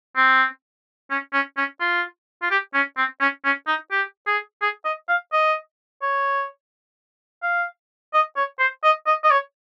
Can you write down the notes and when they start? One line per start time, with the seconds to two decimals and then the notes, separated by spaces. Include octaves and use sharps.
0.16 C4
1.11 C#4
1.33 C#4
1.57 C#4
1.80 F4
2.42 F4
2.51 G4
2.74 C#4
2.97 C4
3.21 C#4
3.44 C#4
3.67 D#4
3.91 G4
4.27 G#4
4.62 G#4
4.85 D#5
5.09 F5
5.32 D#5
6.02 C#5
7.43 F5
8.14 D#5
8.37 C#5
8.59 C5
8.84 D#5
9.07 D#5
9.24 D#5
9.31 C#5